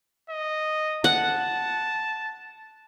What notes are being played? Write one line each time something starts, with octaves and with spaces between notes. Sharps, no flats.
D#5
F#5 A5